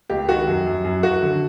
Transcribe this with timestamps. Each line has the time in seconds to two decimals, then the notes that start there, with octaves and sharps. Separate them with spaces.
0.10 C#2 G4
0.28 D#3 F#4
0.47 F#2
0.66 F#2
0.84 F#2
1.03 F#2 F#4
1.22 D3